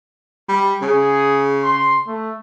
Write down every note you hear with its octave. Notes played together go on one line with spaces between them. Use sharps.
G3
C#3 G#4
C6
A3